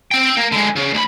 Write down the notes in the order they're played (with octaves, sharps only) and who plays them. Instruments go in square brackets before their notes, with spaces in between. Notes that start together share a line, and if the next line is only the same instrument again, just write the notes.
[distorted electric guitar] C4 G5
A#3
D3 G#3
C#3
D2 B5